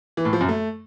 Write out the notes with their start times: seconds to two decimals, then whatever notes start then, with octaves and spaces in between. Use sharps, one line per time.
0.17 E3
0.25 A2
0.33 F3
0.41 F#2
0.49 A3